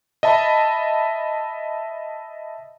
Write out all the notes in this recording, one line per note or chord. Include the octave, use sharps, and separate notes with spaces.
D#5 E5 A5 B5